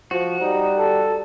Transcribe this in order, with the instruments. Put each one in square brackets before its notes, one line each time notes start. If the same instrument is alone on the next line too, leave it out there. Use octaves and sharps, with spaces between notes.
[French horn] F3 [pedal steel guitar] F#4
[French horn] G3 [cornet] D#4
[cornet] A4